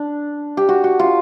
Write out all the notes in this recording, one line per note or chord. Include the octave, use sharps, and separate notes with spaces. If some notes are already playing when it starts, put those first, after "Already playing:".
Already playing: D4
G4
F#4
F#4
F4